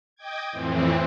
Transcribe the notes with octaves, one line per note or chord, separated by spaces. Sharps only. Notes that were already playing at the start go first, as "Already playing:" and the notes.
D#5 G5 D6 G#6
F2 A2 E3 C4